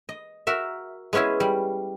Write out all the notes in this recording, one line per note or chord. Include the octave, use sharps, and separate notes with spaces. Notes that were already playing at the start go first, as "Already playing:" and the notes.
D#5
F#4 A#4 E5
G#3 B3 C#4 E4 G#4
G3